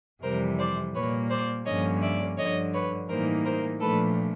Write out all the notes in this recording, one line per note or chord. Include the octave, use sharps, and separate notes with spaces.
F2 C3 E3 G3 A#4 C5
C5 D5
A#2 G3 A#3 B4 C#5
C5 D5
G2 D3 F3 A#3 C#4 C#5 D#5
D5 E5
G2 D3 F3 C#5 D#5
B4 C#5
A2 E3 G3 A#3 D#4 A#4 C5
A#4 C5
A#2 F3 A3 D4 A4 B4